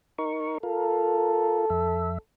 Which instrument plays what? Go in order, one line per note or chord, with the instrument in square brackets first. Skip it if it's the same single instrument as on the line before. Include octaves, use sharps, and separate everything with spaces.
[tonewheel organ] D#4 A#4 C#6
[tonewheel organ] F4 A#4 [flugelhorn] A4
[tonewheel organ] F2 E5